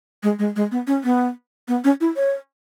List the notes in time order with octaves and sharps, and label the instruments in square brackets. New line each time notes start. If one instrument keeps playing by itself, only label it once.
[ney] G#3
G#3
G#3
B3
C#4
B3
B3
C#4
E4
C#5